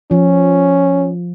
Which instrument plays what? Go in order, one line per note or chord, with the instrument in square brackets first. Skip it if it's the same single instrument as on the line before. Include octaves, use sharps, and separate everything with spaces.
[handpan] F3 [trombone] C#4